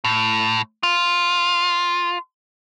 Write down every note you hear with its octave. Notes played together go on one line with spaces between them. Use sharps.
A2
F4